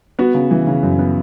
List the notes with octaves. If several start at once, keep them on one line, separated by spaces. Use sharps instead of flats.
B3 F#4
C#3
E3
C#3
F#2
B3